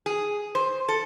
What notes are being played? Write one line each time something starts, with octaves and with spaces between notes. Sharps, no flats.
G#4
C5
A4